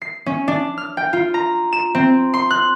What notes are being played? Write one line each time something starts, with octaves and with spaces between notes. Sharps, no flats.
C7
C#4
D4
F6
G5
F4
A#5
E7
C4
C6
F#6